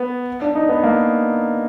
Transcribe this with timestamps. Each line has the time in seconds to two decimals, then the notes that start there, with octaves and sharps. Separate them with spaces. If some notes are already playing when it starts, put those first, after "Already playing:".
Already playing: B3
0.42 D4
0.55 D#4
0.69 B3
0.83 A#3